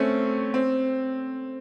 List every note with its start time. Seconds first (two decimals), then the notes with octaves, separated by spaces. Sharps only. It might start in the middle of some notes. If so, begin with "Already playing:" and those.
Already playing: A3 C4 C#4
0.54 C4